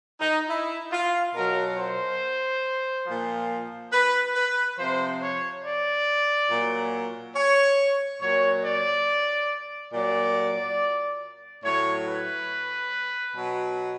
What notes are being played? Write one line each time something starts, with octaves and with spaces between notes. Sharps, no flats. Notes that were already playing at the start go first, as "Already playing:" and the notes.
D#4
E4
F4
B2 F#3 A#4
C5
A#2 F3
B4
B4
C3 F3 C5
C#5
D5
A#2 F#3
C#5
A#2 F#3 C#5
D5
A#2 F#3 D5
A2 F#3 C#5
B4
B2 F#3